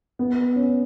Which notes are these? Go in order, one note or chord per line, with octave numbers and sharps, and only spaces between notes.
B3
C#4